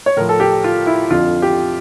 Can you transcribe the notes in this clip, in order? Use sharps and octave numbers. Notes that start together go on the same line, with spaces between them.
C#5
A2 F3 A#4
A4
G4
F4
E4
F2 D3 F3 F4
G4